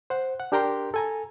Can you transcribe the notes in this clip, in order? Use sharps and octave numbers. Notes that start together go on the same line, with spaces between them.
C5 F#5
F#5
D4 G4 A#4 G5 A#5 C6
A4 G#5 A#5